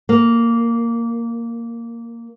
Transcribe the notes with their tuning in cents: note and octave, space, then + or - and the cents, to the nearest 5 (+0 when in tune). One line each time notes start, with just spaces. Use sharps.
A#3 -5